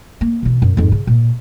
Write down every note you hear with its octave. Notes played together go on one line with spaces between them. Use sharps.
A#3
B2 E3
F#2
F2 G#2
C#3
A#2